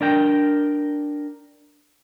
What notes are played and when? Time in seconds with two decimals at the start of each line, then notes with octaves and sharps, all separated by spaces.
0.01 D4 A#4 G5